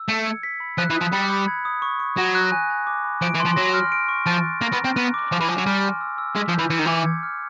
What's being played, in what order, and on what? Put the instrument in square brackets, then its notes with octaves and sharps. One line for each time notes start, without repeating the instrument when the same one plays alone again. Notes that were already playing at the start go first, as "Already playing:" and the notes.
Already playing: [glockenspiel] E6
[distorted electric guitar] A3 [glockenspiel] C#7
[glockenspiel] G#6
B6
B5
[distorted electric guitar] F3 [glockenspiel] F#6
[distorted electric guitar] E3
[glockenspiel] D#6
[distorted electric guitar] F3
[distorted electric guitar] G3 [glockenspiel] C#7
[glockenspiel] B5
G#6
D#6
C#6
C#6
[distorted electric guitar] F#3 [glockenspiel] A#6
[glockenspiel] F#6
G#5
G#5
D6
B5
[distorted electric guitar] F3 [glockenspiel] D7
[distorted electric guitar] E3
[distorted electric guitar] F3 [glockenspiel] C6
[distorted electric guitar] F#3 [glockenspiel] A#6
[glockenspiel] F6
D7
C#6
[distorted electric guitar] F3 [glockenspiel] A6
[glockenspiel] F#6
[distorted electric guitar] A#3 [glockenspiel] A#6
[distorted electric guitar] B3
[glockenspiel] A#5
[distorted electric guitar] C4
[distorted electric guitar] B3 [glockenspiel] F#6
[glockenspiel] D6
[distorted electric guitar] F3 [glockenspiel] G#5
[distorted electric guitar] E3
[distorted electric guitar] F3 [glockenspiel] G#5
[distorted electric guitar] F#3
[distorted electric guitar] G3 [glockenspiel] F6
[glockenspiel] C6
E6
E6
[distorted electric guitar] G#3 [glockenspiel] B6
[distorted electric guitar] F3
[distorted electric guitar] E3 [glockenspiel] G6
[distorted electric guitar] E3 [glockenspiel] C#7
[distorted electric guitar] D#3
[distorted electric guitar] E3 [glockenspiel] D6
[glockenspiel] G#6
F6